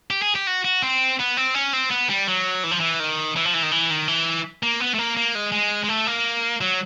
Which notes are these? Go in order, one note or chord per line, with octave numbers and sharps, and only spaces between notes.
G4
G#4
G4
F#4
F#4
C4
B3
C4
C#4
C4
B3
G3
F#3
E3
F3
E3
D#3
E3
F3
E3
D#3
E3
D#3
E3
A#3
B3
A3
A#3
A#3
G#3
G#3
G#3
A3
A#3
F#3